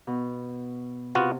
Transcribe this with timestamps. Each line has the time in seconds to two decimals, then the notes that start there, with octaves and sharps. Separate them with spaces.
0.07 B2
1.15 C3 B3 F4 F#4